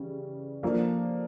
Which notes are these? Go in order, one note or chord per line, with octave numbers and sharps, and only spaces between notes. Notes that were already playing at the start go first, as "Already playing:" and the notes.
Already playing: C#3 E3 G3
F3 A#3 D4 A4